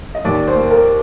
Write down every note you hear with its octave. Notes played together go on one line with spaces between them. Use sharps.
D#5
D#2 D5
C5
A#3
A#4